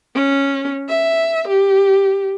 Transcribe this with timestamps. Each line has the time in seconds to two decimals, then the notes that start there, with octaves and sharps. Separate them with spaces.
0.15 C#4
0.89 E5
1.48 G4